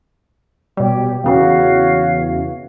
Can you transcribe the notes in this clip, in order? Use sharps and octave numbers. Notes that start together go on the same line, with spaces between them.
B2 G3 G4 C#5
E2 C#3 E3 F#4 C#5 F5